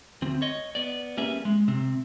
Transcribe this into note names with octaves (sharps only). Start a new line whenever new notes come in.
D2 C4
C#5 D#5
B3 D5
G3 A#3 C#4 G#4 B4 E5
G#3
C3 C4